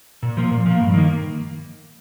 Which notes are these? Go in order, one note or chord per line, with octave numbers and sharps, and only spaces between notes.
A#2
F3 A#3
A#2
F3 A#3
G2
D#3 A#3